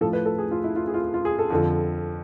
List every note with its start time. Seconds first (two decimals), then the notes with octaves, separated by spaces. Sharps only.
0.01 A2 F3 A4
0.13 B4
0.26 A4
0.39 G#4
0.51 F4
0.64 E4
0.76 F4
0.87 G#4
0.94 F4
1.14 F4
1.25 G#4
1.39 A4
1.50 F2 D3 F3